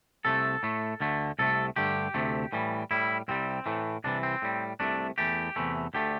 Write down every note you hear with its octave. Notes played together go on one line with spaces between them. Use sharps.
C2 C3 A3 A4
A2 A3
D2 D3 A3
C2 C3 A3 A4
G2 D3 A3 G4
D2 C3 A3
A2 E3 G3
A2 G3 E4
C2 C3 G3 C4
A2 E3 A3
C2 C3 E3 D4
C4
A2 G3
C2 C3 A3 D4
E2 E3 A3 G4
E2 C3 E3 A3
D2 D3 A3 G4